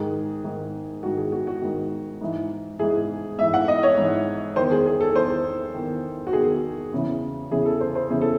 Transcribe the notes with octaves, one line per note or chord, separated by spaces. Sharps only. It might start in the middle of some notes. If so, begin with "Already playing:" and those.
Already playing: G#2 D#3 G#4
G#2 D#3
G#2 D#3 F#4
G#4
F#4
F#4
G#2 D#3
G#2 E3
G#2 E3 G#4
G#2 E3 E5
F#5
D#5
C#5
G#2 E3
E2 D#3 C5
G#4
G#4
A4
E2 D#3 C5
E2 D#3
F#4
E2 D#3 G#4
E2 C#3 E3
E2 C#3 E3 G#4
A4
C5
C5
E2 C#3 E3 G#4
A4